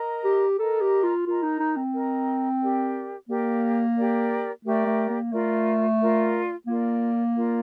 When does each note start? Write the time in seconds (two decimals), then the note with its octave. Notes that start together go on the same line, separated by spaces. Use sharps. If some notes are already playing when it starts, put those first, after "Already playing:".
Already playing: A#4 D#5 A#5
0.24 G4
0.58 A4 A#4 D#5 A#5
0.81 G4
1.03 F4
1.26 F4 A#4 D#5 A#5
1.43 D#4
1.59 D#4
1.77 C4
1.93 A#4 D#5 A#5
2.61 G4 A#4 D5
3.29 A#3 G4 A#4 D5
3.97 G4 A#4 D5
4.65 A3 G4 A#4 D5
4.86 A3
5.09 A#3
5.32 A3 F4 A#4 D5
6.00 F4 A#4 D5
6.67 A#3 F4 A#4 D5
7.35 F4 A#4 D5